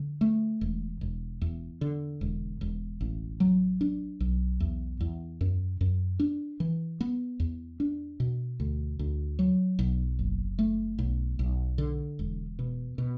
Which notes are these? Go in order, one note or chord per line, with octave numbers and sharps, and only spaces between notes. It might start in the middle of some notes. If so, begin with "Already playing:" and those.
Already playing: D3
A3
E1
E1
E2
D3
E1
E1
A1
F#3
D4
B1
E2
E2
F#2
F#2
D4
E3
B3
E2
D4
B2
D2
D2
F#3
B1
F#1
A3
B1
B1
D3
E1
B2
B2